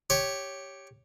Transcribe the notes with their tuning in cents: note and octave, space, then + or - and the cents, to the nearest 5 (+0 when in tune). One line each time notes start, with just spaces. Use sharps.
G4 +0 C#5 +0